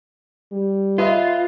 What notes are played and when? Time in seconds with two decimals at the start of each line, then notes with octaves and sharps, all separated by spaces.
0.53 G3
0.98 F4 B4 D#5 E5